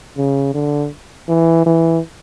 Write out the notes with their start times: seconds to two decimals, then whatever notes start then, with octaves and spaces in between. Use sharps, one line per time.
0.17 C#3
0.54 D3
1.28 E3
1.66 E3